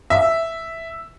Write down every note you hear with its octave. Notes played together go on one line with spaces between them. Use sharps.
E5